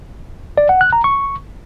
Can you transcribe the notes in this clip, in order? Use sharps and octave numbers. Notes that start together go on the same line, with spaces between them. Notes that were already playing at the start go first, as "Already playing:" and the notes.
D5
F#5
F#6
A#5
C#6